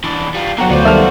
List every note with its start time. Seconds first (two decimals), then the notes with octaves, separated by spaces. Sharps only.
0.04 E3 D4
0.35 G3 F4
0.58 D3 F#3 B3 F#4 F#5 G5 A#5
0.70 D2 F4 F#4 C5 D5
0.85 D#3 G3 B3 A4 E5 A5 F6